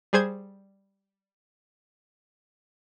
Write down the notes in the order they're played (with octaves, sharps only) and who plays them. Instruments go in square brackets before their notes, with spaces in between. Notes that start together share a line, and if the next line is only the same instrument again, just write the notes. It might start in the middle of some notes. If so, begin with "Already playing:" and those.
[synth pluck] G3 G#4 C5 G#6